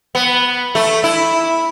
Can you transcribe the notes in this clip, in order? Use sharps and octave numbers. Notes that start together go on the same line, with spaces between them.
B3
A3
E4